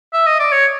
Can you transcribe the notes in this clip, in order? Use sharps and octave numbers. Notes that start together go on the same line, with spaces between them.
E5
D#5
D5
C#5